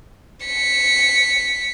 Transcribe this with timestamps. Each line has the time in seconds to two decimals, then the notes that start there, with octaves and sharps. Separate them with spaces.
0.46 B6 C#7